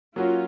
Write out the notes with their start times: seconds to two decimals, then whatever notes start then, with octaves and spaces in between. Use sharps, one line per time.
0.15 F#3 A#3 C#4 F4 F#4 C#5